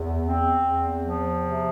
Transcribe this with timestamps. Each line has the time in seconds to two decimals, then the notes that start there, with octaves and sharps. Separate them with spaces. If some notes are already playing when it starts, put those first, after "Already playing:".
Already playing: E2
0.27 C4
0.66 E2
1.04 F3
1.42 C3